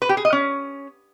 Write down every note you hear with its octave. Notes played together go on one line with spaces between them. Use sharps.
B4
G4
G#4
D#5
C#4